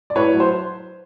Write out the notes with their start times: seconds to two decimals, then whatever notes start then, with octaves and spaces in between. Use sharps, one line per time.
0.10 D5
0.15 A2 B4 C#5
0.32 F#3
0.40 C5